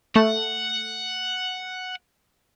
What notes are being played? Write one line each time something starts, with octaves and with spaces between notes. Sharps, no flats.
A3 F#5